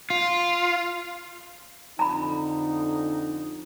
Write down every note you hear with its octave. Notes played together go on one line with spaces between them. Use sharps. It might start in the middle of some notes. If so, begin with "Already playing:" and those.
F4
F2 D3 D#4 A#5 B5